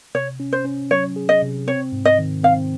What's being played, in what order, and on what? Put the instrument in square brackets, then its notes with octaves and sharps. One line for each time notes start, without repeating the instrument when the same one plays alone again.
[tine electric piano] C3 [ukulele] C#5
[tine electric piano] C#4
[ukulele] C5
[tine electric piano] C#4
[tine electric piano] F#3 [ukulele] C#5
[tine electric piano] G#4
[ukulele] D#5
[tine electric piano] C3
[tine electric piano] C4 [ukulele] C#5
[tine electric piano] G#2
[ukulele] D#5
[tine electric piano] D#3
[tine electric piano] C4 [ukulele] F5